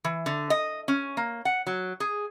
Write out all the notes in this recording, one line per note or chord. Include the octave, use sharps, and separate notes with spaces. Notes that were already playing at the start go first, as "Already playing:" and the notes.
E3
D3
D#5
C#4
A#3
F#5
F#3
G#4